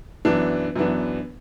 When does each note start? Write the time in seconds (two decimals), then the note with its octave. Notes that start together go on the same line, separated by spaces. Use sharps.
0.25 F#2 E3 B3 D4
0.76 F#2 E3 B3 D4